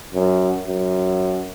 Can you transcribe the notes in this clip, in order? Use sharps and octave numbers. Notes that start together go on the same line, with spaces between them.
F#2
F#2